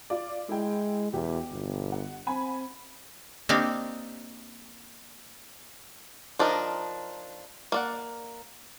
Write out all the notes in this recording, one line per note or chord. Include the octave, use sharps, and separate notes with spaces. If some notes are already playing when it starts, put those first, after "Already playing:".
F4 D5
G#3 E4 G5
E2 B2 G4
G1
F#5
C4 F#5 G#5 B5
A#3 C4 D4 D#4 G4 F5
F3 D4 D#4 A#4
A#3 D5 F#5